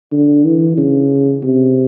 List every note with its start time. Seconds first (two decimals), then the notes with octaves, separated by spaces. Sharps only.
0.12 D3
0.45 E3
0.78 C#3
1.43 C3